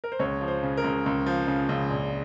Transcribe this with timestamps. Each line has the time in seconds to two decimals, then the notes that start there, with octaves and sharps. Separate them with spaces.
0.04 A#4
0.12 C5
0.19 C#2 C#5
0.41 F3
0.48 C5
0.63 C#3
0.77 A#4
0.84 C#2
1.06 C#2
1.26 F3
1.47 C#3
1.69 C#2
1.90 A#1